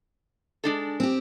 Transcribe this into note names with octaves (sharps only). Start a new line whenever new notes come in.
G#3 D4 A4
C4 G4